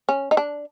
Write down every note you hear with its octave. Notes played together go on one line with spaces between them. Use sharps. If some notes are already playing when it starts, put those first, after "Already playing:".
C#4
D#4
D4